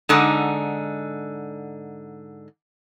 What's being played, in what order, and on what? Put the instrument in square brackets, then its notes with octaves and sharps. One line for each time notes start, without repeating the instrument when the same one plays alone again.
[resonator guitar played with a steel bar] G#2 D3 D#4